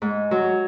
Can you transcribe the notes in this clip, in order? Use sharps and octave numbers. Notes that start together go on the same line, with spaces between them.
G#2
F#3